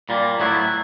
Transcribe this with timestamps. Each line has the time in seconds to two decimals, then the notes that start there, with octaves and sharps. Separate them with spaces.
0.09 A#2 G3 A#3
0.40 A2 F#3 B3 E4